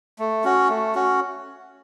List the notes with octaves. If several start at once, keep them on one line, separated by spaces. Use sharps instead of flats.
A3
C#4 F#4
A3
C#4 F#4